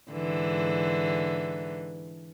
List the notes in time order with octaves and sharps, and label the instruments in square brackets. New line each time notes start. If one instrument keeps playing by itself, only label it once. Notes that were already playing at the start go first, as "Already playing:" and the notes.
[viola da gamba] G#2 D3 E3